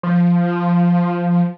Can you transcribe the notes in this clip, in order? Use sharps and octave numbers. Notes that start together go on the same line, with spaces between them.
F3